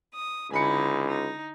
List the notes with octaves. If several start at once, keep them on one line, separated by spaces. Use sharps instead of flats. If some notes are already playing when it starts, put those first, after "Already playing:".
D#6
C#2 D3 D#4 E4 G#5 B5 C#7
D#4